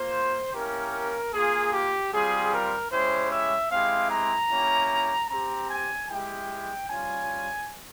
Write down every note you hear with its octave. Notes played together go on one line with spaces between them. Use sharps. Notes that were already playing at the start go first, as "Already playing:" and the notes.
Already playing: A#3 F4 C5
A#3 C#4 E4 G4 A#4
A#3 F4 G#4
G4
G3 C4 F4 G#4
A#4
G#3 C#4 E4 G4 C5
E5
G#3 C4 E4 G4 F5
A#5
A#3 C#4 E4 G4
C4 G4 A#5
G#5
G#3 E4 G4 G5
G3 C#4 F4 G#5